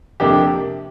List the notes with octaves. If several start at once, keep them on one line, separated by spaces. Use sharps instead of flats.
F2 C3 A#3 D4 G4